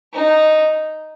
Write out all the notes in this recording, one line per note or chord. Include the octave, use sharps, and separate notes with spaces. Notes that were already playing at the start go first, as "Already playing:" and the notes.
D#4